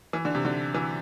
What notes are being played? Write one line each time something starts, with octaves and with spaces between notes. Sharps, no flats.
E3
D3
C3
D3
E3